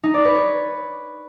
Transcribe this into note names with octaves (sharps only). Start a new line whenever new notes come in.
D#4
D5
B4
C#5